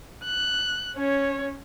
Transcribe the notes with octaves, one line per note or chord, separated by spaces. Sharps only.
F#6
C#4 C#5